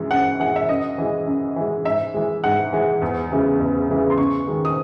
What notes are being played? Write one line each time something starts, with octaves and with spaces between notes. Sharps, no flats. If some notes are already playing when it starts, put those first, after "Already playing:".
Already playing: F#2 E3 G#3
F#2 F#5
E3 G#3 F#5
E5
F#2 D#5
E3 G#3
F#2
E3 G#3
G#2 E5
E3 G#3
G#2 F#5
E3 G#3
E2
C#3 E3 G#3
E2
C#3 E3 G#3
C6
F#2 C#6
D#3 G#3
D#6